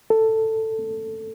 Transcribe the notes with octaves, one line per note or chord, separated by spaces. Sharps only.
A4